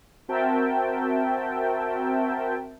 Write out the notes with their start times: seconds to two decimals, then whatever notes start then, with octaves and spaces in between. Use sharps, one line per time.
0.28 C4 F#4 A#4 E5 G5 A5